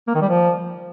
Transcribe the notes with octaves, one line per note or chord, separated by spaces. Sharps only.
A#3
D#3
G3
F3